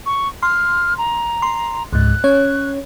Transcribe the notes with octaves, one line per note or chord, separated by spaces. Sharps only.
C#6
C6 F6
A#5
C6
C#2 G#2 F#6
C#4 C#5